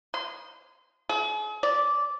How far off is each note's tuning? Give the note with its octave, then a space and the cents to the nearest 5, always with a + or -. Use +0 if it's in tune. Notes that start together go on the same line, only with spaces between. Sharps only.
C6 -30
G#4 +40
D5 -10